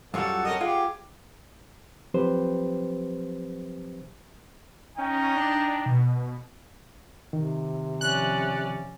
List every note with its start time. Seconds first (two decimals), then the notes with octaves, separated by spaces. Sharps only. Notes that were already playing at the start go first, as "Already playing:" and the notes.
0.14 F#2 F#3 G3 F4 F#4 A4 F#5
0.45 C#4 A4 A#4 D#5
0.61 G#3 F4 G4
2.14 F3 F#3 C4 G4 B4 C5
4.98 C#4 D#4 G5
5.37 D4
5.86 B2
7.33 C3 D#3
8.01 F3 C#4 D5 F#6